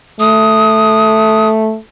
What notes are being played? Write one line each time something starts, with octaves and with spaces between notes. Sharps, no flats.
A3 D#6